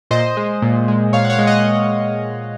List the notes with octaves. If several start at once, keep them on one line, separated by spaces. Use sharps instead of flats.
A#2 C5 D#5
G#3
A#2
G#3
A#2 C#5 F5
F#5
C#5 F5
G#3
D#5 F#5